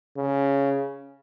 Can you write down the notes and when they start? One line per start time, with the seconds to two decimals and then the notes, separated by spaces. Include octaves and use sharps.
0.17 C#3